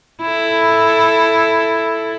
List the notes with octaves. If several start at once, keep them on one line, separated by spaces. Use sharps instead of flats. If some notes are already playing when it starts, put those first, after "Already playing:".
E4 A4